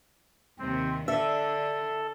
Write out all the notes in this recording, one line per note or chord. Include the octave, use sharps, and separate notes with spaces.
D#2 C3 C4
D3 D4 A4 E5